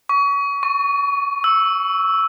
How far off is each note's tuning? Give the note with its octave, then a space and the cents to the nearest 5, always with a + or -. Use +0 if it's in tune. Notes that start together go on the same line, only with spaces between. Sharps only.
C#6 +30
C#6 +0
E6 -5